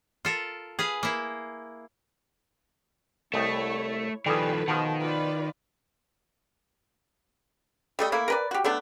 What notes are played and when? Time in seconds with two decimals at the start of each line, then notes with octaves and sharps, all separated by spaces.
0.25 F4 A4 A#4
0.79 G#4 B4 F5
1.03 A#3 E4
3.34 C2 A3 E4 C#5 D#5 G5
4.26 D#3 F3 G3 G#4 A4 B4
4.68 B2 D#3 F3
5.02 F4 B4 D5
7.99 G3 A3 D#5
8.12 A3 A#3 E4
8.28 A#4 B4 D5
8.51 F#4 G4
8.64 A3 B3 D4